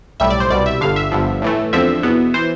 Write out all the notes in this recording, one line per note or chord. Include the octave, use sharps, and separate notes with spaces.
B1 A2 G3 E5
D5
C5
C2 B2 G3 D5
E5
G1 G2 D3 F5
E5
G1 G2 D3 F3
A2 E3 A3
E2 D3 F3 C4 E5
E2 B2 B3
E3 C5